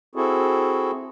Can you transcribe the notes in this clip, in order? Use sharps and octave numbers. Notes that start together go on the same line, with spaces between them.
C4 E4 F#4 G#4 A4